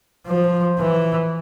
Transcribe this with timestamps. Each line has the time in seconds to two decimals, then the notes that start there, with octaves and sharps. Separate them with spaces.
0.27 F3
0.78 E3